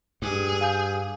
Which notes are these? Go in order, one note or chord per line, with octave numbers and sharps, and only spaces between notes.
G2 G#4
F5 G#5 G6